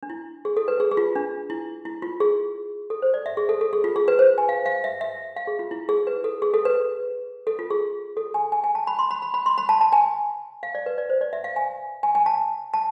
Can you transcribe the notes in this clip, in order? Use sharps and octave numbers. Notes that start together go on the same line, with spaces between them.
D4
E4
G#4
A4
B4
G#4
G#4
F4
D4
E4
E4
F4
G#4
A4
C5
D5
E5
G#4
A4
A4
G#4
F4
G#4
B4
C5
G#5
F5
F5
E5
E5
F5
G#4
F4
E4
G#4
B4
A4
G#4
A4
B4
A4
F4
G#4
A4
G#5
G#5
G#5
A5
B5
C6
B5
B5
B5
C6
B5
A5
A5
G#5
F5
D5
B4
D5
C5
D5
E5
F5
G#5
G#5
G#5
A5
A5